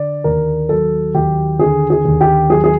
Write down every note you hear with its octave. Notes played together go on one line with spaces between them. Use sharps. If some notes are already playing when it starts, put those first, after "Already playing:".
Already playing: D3 D5
D#2 A#4
F#3 A4
D#2 G4
D3 G#4
G#4
D#2
G4
F#3 G#4
G#4